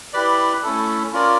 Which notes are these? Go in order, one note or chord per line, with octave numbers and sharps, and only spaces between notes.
E4 G4 B4 D5
A3 C#4 E4 A4
C#4 F4 A#4 D5